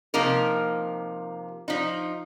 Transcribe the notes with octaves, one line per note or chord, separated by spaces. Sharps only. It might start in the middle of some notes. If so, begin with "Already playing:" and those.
C3 F3 A#3 D#4 A#4
F3 D#4